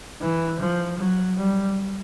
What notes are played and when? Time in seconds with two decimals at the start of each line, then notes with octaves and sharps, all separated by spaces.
0.22 E3
0.60 F3
0.98 F#3
1.37 G3